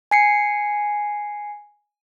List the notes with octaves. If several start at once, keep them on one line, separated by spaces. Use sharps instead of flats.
G#5 C7 C#7